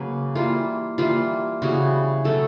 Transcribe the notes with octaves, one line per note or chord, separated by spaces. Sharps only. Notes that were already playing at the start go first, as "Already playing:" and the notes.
Already playing: C#3 F#3 A#3 B4
E3 G3 A#3 F4
E3 G3 A#3 F4
C#3 E3 G3 B3 F#4
B2 F#3 A3 A4